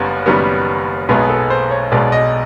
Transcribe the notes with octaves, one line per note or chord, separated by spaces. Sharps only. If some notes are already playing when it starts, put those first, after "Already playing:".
Already playing: F#1 F#2 G3 B3
F#1 F#2 D#3 G3 B3
B1 B2 G#3 B3 G#4
A4
C5
C#5
B1 B2 G#3 B3 D5
D#5